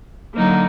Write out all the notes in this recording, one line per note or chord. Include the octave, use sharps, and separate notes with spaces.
D3 F#3 A#3 D#4